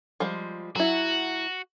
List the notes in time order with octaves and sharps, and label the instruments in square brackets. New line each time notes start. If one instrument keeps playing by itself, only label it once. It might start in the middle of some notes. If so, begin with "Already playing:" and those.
[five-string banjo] F3 G3 G#3
[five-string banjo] F#3 E4 [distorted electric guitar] F#4